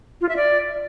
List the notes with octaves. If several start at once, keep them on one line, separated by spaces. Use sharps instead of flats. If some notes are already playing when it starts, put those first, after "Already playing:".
F4
E5
D5